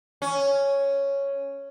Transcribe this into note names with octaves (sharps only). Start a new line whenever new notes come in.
C#4